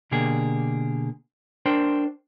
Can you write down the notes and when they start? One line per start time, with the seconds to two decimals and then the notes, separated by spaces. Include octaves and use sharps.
0.11 B2 D3 A#3 G4 G#4
1.66 D4 A#4 C5 G5 C6